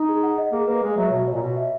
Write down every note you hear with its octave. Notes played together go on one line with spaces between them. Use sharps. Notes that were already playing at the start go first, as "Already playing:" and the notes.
Already playing: D#4
G#4
F#5
D#5
A#3 G#4
A#3 B4
G#3 G#4
F#3 E5
B2 F#4
C#5
A#2
B2 F#4
E5